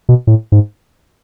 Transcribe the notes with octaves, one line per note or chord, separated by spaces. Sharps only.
B2
A2
G#2